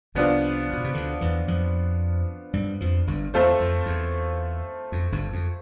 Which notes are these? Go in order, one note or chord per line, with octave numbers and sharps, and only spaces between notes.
C2 C3 F3 B3 D4 F4
B2
C3
D2 D3
E2 E3
F2 F3
G2 G3
F2 F3
G1 G2
E2 A3 C4 F4 A4 C5
F2
E2
F2
G1 G2
F2